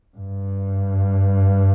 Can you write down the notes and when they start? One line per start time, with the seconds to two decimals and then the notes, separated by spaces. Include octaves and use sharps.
0.17 G2